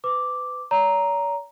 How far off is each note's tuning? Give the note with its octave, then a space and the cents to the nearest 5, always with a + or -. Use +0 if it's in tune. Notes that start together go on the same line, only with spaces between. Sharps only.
B4 +35 D6 +0
C#5 +45 A#5 +0